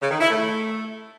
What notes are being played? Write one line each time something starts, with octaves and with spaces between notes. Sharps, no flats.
C#3
D#3
E4
A3